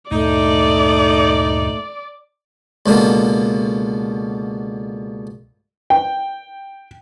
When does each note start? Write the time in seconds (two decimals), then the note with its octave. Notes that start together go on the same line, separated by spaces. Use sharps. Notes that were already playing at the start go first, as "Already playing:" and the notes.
0.12 D2 G2 A#2 A3 D#4 D5
2.86 C#2 B2 D3 A#3
5.90 G5